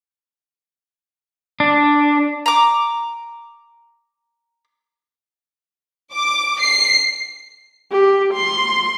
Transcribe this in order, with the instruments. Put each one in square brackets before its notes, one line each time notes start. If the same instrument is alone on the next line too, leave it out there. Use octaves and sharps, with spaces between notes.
[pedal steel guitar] D4
[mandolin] A#5 D6
[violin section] D6
C7
[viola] G4
C6